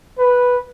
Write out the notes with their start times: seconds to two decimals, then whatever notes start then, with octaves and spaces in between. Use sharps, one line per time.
0.18 B4